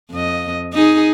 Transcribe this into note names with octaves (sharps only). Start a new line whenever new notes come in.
F2 D#5
D#4 G#4